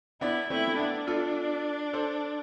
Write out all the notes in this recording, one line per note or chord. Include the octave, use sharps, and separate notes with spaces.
B3 D4 E4
A3 C4 E4
A3
B3 D4
F4 A4
A4 C5